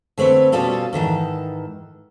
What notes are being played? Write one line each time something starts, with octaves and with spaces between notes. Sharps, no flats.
D3 A3 C4 B4 C#5
B2 G3 C#4 F4 A4
G#2 D#3 E3 A4